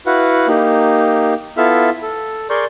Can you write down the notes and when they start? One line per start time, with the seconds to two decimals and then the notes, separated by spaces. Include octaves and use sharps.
0.06 E4 F#4 B4 F5 F#5
0.48 A#3 D#4 G4
1.57 B3 E4 F4 A4 E5 F5
2.03 A4
2.50 G#4 A#4 D5 C6 C#6 G6